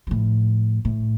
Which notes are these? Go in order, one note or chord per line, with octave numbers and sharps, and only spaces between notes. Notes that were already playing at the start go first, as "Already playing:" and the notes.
A2 F3
A2